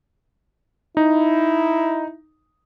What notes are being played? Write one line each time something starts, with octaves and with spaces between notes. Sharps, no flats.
D#4 E4